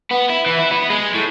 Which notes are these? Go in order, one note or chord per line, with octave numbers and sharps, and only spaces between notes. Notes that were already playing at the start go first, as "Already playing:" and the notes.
B3
E4
E3
E4
B3
G#3
A2